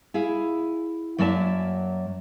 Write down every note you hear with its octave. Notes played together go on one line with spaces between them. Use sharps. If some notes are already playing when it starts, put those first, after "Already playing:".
E4 G#4 F5
F#2 F#3 A#3 D5 E5 A5